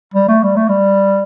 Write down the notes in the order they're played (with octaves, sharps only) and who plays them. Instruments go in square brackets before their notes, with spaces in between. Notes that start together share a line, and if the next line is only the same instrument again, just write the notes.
[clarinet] G3
A3
G3
A3
G3